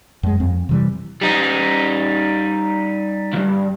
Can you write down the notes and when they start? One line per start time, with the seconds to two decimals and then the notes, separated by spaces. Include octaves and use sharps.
0.23 F#2 G#3
0.40 F2 C4
0.69 C3 E3 G3
1.22 G3 D#4
3.33 C#2 G2